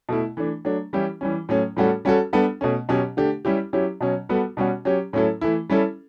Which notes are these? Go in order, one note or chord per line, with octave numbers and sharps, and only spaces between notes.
B2 A3 E4
E3 A3 D4
F#3 A3 D4
E3 G3 C#4 E4 G4
E3 G3 C#4
A2 F#3 A3 C#4
A2 G3 C#4 F#4 A4
G3 C#4 F#4 A4
G3 B3 D4 A4
B2 A3 C#4
B2 F#3 C#4 G4
D3 A3 D4 G4
G3 C#4 E4 G4
F#3 C#4 E4 G4
B2 F#3 C#4
G3 B3 F#4 A4
B2 G3 C#4 F#4
F#3 C#4 G4
A2 F#3 C#4 E4 A4
E3 A3 E4
G3 C#4 E4 A4